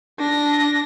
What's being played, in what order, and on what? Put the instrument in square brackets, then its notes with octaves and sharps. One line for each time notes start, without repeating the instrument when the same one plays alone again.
[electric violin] D4 A#6